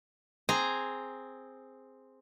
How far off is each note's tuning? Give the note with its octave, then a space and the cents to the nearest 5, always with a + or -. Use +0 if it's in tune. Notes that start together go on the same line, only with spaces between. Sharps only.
C4 +0 G#4 +0 A#5 +0